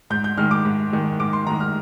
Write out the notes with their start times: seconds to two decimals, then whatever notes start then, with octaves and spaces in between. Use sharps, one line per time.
0.10 G#2 G6
0.24 G6
0.38 D#3 G#3 F6
0.51 D6
0.65 G#2
0.92 D#3 G#3
1.19 G#2 D6
1.33 C6
1.47 D#3 G#3 A#5
1.60 F6